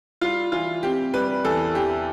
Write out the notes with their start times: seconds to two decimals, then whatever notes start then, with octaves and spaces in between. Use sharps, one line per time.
0.21 G3 F4
0.52 E3 F4
0.83 C4 G4
1.14 G3 B4
1.44 E2 A4
1.75 E3 G4